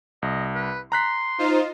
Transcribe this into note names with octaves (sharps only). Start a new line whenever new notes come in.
C2 D#5
B4
A#5 C6 F#6 B6
D#4 F4 C5